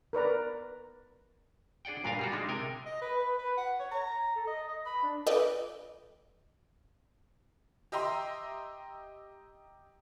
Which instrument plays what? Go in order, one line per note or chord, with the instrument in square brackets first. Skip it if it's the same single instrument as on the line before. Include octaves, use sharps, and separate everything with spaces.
[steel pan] A#4 B4 D5 A#5
[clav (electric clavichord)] D4 G#4 D5 F#5 G5
G2 A#2 D4 A#4 B4 F5
G3 F4 F#4
G#3 D4 D#4
C3 A#4 G5 G#5
[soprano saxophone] D#5
B4
B4
B4
F#5
C#5
A#5
A4
D#5
D#5
B5
D4
[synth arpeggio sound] F4 A4 B4 D5 D#5 G5
[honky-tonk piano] G4 D#5 E5 A#5 C6